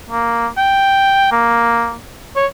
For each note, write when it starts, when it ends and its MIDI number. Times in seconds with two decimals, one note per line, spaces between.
0.10 0.47 58
0.58 1.30 79
1.31 1.95 58
2.36 2.46 73